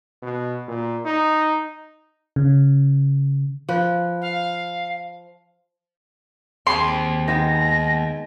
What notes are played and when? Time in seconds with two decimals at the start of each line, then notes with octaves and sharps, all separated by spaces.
0.22 B2
0.68 A#2
1.05 D#4
2.36 C#3
3.69 F3 B4
4.21 F5
6.67 D#2 C4 G#4 C6
7.28 D#3 G#3 B3 A#6